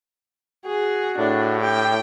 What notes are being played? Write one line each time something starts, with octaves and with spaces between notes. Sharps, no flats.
F#4 G#4
A2 D4
G4 G5